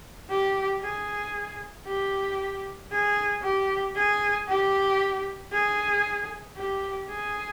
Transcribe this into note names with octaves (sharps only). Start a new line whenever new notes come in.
G4
G#4
G4
G#4
G4
G#4
G4
G#4
G4
G#4